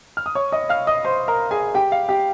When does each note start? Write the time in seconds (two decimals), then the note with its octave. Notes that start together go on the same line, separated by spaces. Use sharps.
0.17 F6
0.26 D#6
0.35 C#5 C#6
0.52 D#5 D#6
0.69 F5 F6
0.87 D#5 D#6
1.05 C5 C6
1.28 A#4 A#5
1.51 G#4 G#5
1.74 G4 G5
1.92 F5
2.09 G4 G5